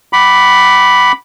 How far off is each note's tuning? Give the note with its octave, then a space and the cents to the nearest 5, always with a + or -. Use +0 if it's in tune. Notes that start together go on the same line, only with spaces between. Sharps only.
F#5 +25 B5 +0 D6 +0